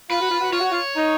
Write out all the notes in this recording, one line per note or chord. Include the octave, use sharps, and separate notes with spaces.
F4 B4
F#4
F4
F#4
F4 C#5
F#4
F4
D#4